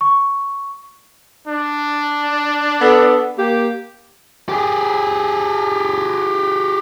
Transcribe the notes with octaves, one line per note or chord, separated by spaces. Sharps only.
C#6
D4
B3 A4
A#3 G4
G4 G#4